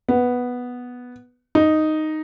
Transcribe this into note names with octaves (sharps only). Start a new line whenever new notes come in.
B3
D#4